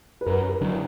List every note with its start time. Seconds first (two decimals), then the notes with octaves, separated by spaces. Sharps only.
0.21 B4
0.26 F#2 A#4
0.49 A#4
0.61 D3 F#3 D4